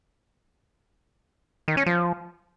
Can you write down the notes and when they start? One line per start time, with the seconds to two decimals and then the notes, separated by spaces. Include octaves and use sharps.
1.68 D#3
1.77 C#4
1.86 F3